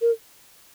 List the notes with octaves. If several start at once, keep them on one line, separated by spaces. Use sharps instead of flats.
A#4